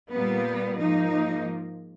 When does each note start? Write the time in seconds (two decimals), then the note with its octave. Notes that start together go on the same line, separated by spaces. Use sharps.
0.13 A#2 G3 A#3 B3
0.80 G#2 F3 A#3 D#4